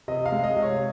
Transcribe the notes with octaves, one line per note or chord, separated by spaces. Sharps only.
C3 D#5
F5
G#3
D#5
C3
C#5